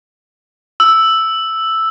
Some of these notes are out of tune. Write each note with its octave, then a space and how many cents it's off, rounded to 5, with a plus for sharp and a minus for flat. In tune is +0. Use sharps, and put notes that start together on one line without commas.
E6 +0